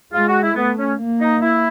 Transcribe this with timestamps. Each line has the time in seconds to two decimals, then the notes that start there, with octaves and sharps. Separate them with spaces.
0.13 G#3 F4
0.28 F#4
0.42 E4
0.55 A3 B3
0.78 C#4
0.99 A#3
1.21 D#4
1.41 E4